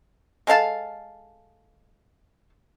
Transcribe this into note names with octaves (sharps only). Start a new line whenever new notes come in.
G#3 A4 F5 A5